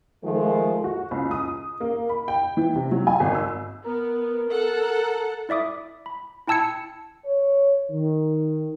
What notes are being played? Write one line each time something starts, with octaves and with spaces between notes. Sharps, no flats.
D#3 F3 G#3 A3
F#4
C#2
D#6
A#3
B5
G5
E3
C3
F#3
G#5
G#1
E6
B3 A#4
A4 F#5
E4 D5 E5 D6 D#6
B5
E4 G5 A5 E6 G#6 C#7
C#5
D#3